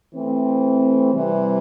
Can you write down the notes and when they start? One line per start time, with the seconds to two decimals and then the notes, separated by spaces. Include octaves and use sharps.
0.13 E3 A3 C4
1.12 C3 E3 G3